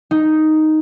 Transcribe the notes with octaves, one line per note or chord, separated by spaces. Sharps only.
D#4